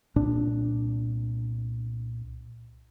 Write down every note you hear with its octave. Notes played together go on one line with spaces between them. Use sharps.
C2 A#2 D4